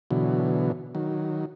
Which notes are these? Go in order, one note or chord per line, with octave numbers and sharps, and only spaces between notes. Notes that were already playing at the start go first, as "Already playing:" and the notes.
B2 D3 E3 F#3
D#3 F#3